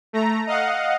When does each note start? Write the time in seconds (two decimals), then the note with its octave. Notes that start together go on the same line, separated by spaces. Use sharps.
0.13 A3 A#5
0.47 D#5 F5 F#5